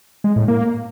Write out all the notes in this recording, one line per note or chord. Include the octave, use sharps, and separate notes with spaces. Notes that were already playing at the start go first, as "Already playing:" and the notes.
G#3
A2
A#3